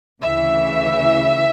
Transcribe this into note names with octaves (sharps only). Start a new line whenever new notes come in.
D2 C#3 E3 E5